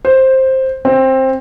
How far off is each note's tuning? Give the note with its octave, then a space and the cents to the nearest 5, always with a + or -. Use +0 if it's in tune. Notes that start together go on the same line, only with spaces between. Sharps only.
C5 +10
C4 +15